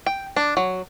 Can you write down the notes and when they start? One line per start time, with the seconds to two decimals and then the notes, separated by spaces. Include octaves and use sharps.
0.06 G5
0.36 D4
0.57 F#3